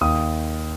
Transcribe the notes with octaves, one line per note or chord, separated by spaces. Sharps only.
D#2 D#6